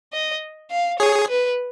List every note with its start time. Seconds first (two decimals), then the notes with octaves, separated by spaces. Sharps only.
0.13 D#5
0.71 F5
0.99 G#4 C#5
1.28 B4